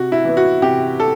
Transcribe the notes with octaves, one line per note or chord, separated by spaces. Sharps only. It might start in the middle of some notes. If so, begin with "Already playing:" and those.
Already playing: C3 F#4
E4
E3 B3
F#4
C3 G4
A4